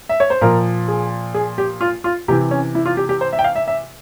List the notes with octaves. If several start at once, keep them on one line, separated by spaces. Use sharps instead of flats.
E5
C#5
C5
A#2 F3 A#4
G#4
G#4
G4
F4
F4
C3 E3 G4
C#4
E4
F4
G4
G4
C5
E5
G5
F5
E5
E5